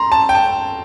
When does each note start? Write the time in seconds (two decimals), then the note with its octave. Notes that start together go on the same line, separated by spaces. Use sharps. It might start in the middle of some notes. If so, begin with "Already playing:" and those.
Already playing: A#5 C6
0.12 A5
0.29 G5
0.35 A5